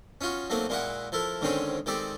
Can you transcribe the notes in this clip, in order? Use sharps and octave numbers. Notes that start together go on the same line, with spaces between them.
C#4 D#4 F4 F#4
F#3 A3 A#3 C4 D#4
A#2 G#3 A#3 E4 F#4 F#5
F3 E4 A4 A#4
G#2 D3 D#3 C4 C#4 G#4
D#3 G#3 C4 G4 A4 D5